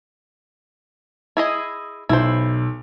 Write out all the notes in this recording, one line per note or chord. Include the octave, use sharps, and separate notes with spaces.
E4 G#4 D#5
B1 E4 C5